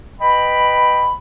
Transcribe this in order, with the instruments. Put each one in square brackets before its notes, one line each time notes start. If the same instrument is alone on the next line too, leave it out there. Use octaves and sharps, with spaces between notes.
[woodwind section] B4 D#5 G5 B5